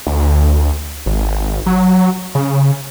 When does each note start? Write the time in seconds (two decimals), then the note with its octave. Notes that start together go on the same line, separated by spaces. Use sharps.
0.07 D2
1.06 G#1
1.66 F#3
2.35 C#3